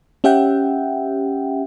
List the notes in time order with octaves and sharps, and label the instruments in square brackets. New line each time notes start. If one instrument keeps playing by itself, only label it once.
[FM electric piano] C#4 G4 E5 F#5 G5